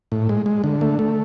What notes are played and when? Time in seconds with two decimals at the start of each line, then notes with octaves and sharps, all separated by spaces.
0.12 A2
0.29 G#3
0.46 G#3
0.64 D3
0.81 A3
0.99 A3